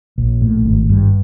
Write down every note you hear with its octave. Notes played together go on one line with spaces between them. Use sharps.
A#1
A2
G#1
G2